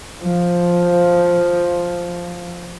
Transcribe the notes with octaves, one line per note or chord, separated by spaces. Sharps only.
F3